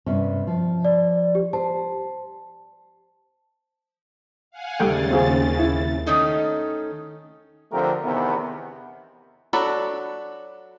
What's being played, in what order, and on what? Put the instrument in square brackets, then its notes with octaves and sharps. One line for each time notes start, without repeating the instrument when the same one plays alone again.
[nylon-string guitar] G2 C3 C#4
F3
[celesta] D5
G4
[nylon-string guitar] C5 [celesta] A5
[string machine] F5 F#5 G#5
[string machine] D#2 C#3 A6 [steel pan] G3 A3 G5
[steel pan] C4 F4 G#4
E4
[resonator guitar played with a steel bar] D#3 A3 C#4 D#4 A4
[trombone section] D3 F3 A3 C4 G4 A#4
E2 C3 D#3 B3
[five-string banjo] F#3 D4 F#4 A4 B5